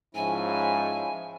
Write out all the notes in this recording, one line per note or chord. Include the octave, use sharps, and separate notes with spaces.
G#2 F3 C#4 E4 G#5